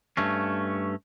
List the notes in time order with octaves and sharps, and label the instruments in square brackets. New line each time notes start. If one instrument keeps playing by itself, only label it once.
[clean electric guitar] G2 A3 C#4